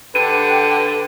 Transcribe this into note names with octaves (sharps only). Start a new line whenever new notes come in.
D3 G4 B4 F#5 D#7